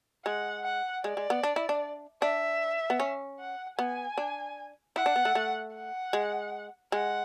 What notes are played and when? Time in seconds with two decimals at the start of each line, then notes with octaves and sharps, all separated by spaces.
0.25 G#3 F#5
0.64 F#5
1.03 G#3 D5
1.17 G#3
1.30 B3
1.43 D4
1.56 E4
1.69 D4
2.22 D4 E5
2.90 B3
3.00 C#4
3.40 F#5
3.79 B3 G#5
4.18 D4
4.96 E4 F#5
5.06 D4
5.16 B3
5.25 A3
5.35 A3
5.74 F#5
6.13 G#3
6.92 G#3 F#5